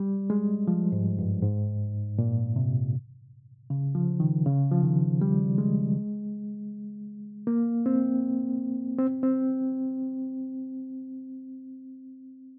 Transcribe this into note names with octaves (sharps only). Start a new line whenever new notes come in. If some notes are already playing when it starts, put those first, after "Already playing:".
Already playing: G3
G#3
F3
G#2
G2
G#2
A#2
C3
C#3
F3
D#3
C#3
F3
D#3
G3
G#3
A#3
C4
C4
C4